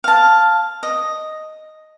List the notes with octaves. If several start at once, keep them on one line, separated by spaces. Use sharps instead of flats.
F5 A5
D#5